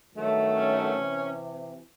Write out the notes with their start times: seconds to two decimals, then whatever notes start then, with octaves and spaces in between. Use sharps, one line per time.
0.13 G2 D#3 F#3 A3
0.53 C#4
0.93 C3 E3